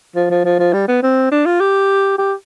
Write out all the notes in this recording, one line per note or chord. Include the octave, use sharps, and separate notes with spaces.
F3
F3
F3
F3
G3
B3
C4
D4
F4
G4
G4